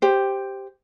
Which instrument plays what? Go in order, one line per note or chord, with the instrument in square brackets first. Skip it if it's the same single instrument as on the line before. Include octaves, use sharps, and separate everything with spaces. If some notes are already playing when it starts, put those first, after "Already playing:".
[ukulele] G4 C5